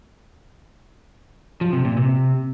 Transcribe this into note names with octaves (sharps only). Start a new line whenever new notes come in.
F3
C3
A#2
C3